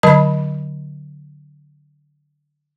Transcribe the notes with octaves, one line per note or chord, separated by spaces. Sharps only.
D3 F#3 D#5 A5 B5